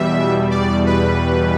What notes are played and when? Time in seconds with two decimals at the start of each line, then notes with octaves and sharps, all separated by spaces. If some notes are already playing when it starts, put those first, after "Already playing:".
Already playing: E2 B2 G3 E5
0.51 D5
0.86 B4